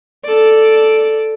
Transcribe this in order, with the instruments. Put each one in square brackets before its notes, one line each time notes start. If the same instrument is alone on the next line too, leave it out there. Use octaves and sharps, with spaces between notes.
[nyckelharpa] A4 D5